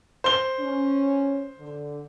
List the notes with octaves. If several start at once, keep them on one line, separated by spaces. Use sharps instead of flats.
C5 G7
C#4
D3